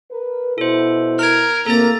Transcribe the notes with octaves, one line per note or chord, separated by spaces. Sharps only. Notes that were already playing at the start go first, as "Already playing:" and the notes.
A#4 B4
B2 E4 A4 C5
A#4 F6 G#6
A2 C3 A#3 A4 A#5 A6